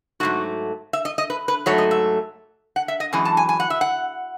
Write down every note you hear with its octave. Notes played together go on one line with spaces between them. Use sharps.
G#2 D#3 F#3 A3 F#4
E5
D#5
D#5
B4
B4
G#2 F#3 A3 C#5
D#5
E5
F#5
E5
D#5
F#2 E3 G#3 G#5
A5
G#5
G#5
F#5
E5
F#5